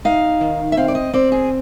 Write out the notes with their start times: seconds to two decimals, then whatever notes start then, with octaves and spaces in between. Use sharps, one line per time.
0.05 D#4 F5
0.41 D#3
0.72 E5
0.77 C4 F5
0.88 D5
0.95 D#5
1.13 C4 D5
1.32 G#4